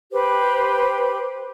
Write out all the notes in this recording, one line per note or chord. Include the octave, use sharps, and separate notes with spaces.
G4 B4 C5